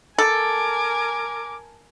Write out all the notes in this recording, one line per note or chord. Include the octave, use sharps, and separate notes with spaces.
A4 A#4 G#5 D6